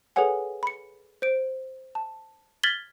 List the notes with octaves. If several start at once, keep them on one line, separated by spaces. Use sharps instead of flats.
G#4 A4 B4 C#5 F#5 G#5
B5 C#7
C5 D7
A5
F6 G#6 A6 B6 F#7 G7